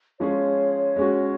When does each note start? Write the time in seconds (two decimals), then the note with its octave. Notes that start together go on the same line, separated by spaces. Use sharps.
0.20 F3 G#3 C#4 F4 G#4 C#5
0.96 G#3 C#4 F#4